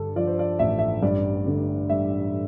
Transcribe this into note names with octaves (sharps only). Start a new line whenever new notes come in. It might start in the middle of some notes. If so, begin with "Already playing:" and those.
Already playing: G2 D3 A4
F3 D5
C5
D5
A1 E5
E5
G2 D5
D3
G3 E5